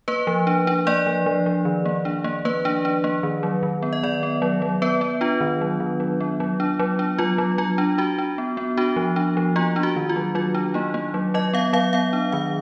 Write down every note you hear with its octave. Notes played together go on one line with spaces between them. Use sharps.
A#3 B4
F3
D4
D4
A#3 D5
F3
F3
F3
D#3
A#3
D4
A#3
A#3 B4
D4
D4
A#3
D#3
F#3
D#3
B3
D#5
D#3 D5
B3
F#3
F#3
B3 B4
B3
D4 F4
D#3
F#3
D#3
F#3
B3
F#3
D4
F#3
D4
F#3 F4
F#3
F#3 F4
D4
D4 F#4
D4
B3
B3
D4 F#4
F3
D4
F3
A#3 F4
D4
F#4
D#3
F4
F#3
F#3 F4
D4
A#3 D#4
A#3
F#3
F#3 D#5
B3 F5
F#3 F5
B3 F5
D4
D#3 F5